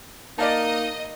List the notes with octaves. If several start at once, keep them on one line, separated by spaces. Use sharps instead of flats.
A#3 D#4 D5 D#5 F5 A5